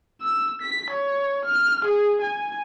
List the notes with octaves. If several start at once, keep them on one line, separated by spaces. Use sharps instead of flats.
E6
B6
C#5
F6
G#4
G#5